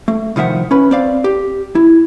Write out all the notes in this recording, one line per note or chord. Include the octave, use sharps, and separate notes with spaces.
A3
C2 D#3 F3 E5 F#5
C#4 B4
C4 D5 F5
G4
E4